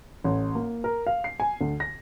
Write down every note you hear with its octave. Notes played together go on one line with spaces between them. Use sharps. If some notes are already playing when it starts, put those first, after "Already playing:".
A1
A#3
A#4
F5
C7
G#5
D2
A#6